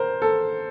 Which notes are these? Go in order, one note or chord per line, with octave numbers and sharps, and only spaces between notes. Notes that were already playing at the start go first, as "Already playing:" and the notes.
Already playing: A#4 C5
A4